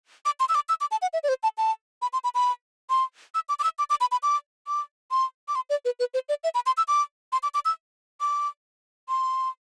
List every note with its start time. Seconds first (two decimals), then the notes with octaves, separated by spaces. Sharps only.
0.25 D6
0.40 C6
0.49 E6
0.55 D6
0.69 E6
0.81 D6
0.91 A5
1.02 F#5
1.13 E5
1.24 D5
1.29 C5
1.43 A5
1.58 A5
2.02 B5
2.13 C6
2.24 B5
2.35 B5
2.90 C6
3.35 E6
3.49 D6
3.59 D6
3.64 E6
3.79 D6
3.90 D6
4.01 B5
4.12 B5
4.23 D6
4.67 D6
5.11 C6
5.48 D6
5.55 C6
5.70 D5
5.85 B4
5.99 B4
6.14 C5
6.29 D5
6.44 E5
6.55 B5
6.66 C6
6.77 E6
6.88 D6
7.32 C6
7.43 D6
7.54 D6
7.65 E6
8.21 D6
9.09 C6